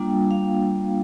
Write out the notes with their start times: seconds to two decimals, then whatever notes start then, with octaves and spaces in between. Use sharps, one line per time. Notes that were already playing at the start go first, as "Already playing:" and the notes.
Already playing: G3 A#3 D4 F4 G5
0.31 F5